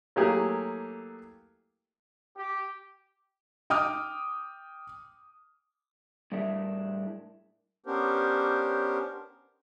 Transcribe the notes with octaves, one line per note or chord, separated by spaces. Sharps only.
F#3 A3 A#3 E4 G4 G#4
G4
G5 D6 D#6 F6
A2 G3 D4 G#4 A#4 E5
B3 C#4 D4 G4 A#4 C5